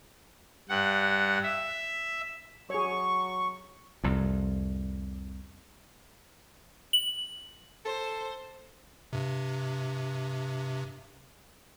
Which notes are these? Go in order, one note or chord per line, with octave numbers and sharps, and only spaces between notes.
G2 F#5
E5
F#3 G#4 C#5 C#6
C2 F2
F#7
A4 C5
G2 C3